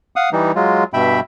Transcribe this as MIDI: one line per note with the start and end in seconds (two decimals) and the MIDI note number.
0.16 0.30 77
0.16 0.30 78
0.16 0.30 87
0.33 0.52 52
0.33 0.52 55
0.33 0.52 63
0.55 0.84 54
0.55 0.84 56
0.55 0.84 65
0.94 1.20 43
0.94 1.20 47
0.94 1.20 76
0.94 1.20 79
0.94 1.20 83